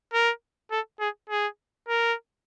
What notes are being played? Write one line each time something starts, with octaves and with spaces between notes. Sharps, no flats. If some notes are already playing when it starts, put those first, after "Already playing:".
A#4
A4
G#4
G#4
A#4